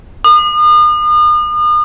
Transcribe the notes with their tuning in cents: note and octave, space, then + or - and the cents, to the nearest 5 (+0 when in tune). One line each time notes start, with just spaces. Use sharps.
D#6 -40